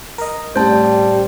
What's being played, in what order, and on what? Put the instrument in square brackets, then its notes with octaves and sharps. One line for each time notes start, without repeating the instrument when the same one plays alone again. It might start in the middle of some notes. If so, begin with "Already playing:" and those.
[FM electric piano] A#4 D#5
[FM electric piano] A2 C4 [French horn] G3 [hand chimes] C#4 A5 [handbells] C5